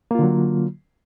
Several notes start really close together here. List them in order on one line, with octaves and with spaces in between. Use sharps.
A#3 F4 D3 F#3